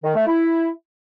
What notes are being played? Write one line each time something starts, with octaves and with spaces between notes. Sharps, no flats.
D#3
A3
E4